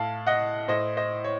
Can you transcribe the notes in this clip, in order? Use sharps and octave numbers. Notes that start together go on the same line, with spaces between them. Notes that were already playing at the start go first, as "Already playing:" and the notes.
Already playing: A2 F5 A5
D#5 F#5
A2 C5 D#5
C5 D#5
C#5